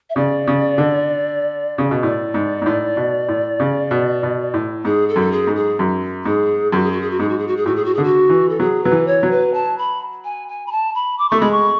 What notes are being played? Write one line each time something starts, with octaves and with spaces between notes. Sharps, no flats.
E5
C#3 D5
C#3
D3
C#3
B2
A2 D5
G#2
G#2
A2
B2
A2
C#3
B2
B2
A2
G#2 G#4
A4
F#2
G#4
G#2
G#4
F#2
G#2 G#4
F#2 F#4
G#4
F#4
G#4
F#4
G#2 G#4
F#4
G#4
F#4
G#4
A2 F#4
G#4
F#4
D3 G#4
F#4
E3
A4
F#3 G#4
F#3 B4
E3
C#5
F#3
B4
A5
B5
G#5
G#5
B5
A5
B5
D6
A3 C#6
G#3 B5
C#6